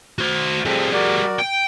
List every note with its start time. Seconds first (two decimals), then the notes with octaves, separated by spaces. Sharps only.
0.18 F#4 C5
0.65 F3 G3 C4 G#4 A4
0.93 F#4 A#4 D5
1.39 G5